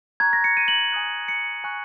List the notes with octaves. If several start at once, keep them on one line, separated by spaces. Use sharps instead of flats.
A#5 C#6 F#6 G#6
A#6
C#7
D#7
F#7
G#5 D#6 F#6
C#7
G#5 C#6 F#6